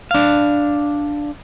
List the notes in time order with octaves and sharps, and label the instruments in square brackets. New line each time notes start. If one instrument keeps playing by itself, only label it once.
[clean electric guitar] D4 F5